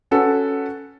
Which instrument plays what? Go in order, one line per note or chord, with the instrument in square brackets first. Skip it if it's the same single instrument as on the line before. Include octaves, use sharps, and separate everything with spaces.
[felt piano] C#4 F#4 A4 B4 F#5